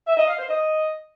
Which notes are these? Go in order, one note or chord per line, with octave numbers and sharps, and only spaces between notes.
E5
D#5
F5
C5
D#5